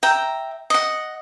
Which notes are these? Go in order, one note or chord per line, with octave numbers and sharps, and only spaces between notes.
E5 G5 A#5
D#5 F#5